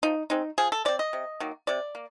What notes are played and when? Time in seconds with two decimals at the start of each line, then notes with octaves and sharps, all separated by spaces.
0.03 F3 D#4
0.30 G#3 C4 D#4
0.58 F3 G#4
0.72 A4
0.85 G#3 C4 D5
0.99 D#5
1.13 C3
1.40 D#3 F#3 A#3
1.67 C3 D5
1.95 A#3